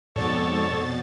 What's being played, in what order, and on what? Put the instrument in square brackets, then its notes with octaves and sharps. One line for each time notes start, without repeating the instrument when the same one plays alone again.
[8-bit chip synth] F2 B2 A6 [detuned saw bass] G#2 [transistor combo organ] A4 C#5 [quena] D5